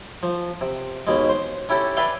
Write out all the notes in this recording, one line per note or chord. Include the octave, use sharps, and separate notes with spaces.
F3
C3
D#2 B2 G#3
C5
C#4 E4 G4 A4
B4 D5 E5 F5 G5 G#5